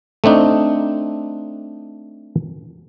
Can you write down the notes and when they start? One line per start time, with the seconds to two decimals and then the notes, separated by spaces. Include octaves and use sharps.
0.24 A3 C4 D4 D#4